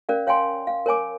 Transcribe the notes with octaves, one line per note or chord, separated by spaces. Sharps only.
C#4 A#4 D5 F5
C#5 F5 G5 G#5 C6
F5
A#4 C#5 G#5 D6